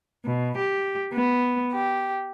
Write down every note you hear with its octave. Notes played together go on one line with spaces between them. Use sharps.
B2
G4
B3
G4